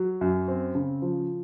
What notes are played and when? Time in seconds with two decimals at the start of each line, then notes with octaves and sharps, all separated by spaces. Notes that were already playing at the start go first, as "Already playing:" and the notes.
Already playing: F#3
0.21 F#2
0.48 C4
0.75 C#3
1.02 F3